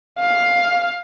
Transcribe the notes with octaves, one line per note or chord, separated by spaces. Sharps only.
F5